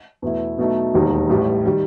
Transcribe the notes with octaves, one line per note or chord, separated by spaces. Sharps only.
E2 B2 A3 E4
B2 F#3 A3 D#4
E1 D#2 D#3 G3 D#4
A1 A2 G3
D#3 G3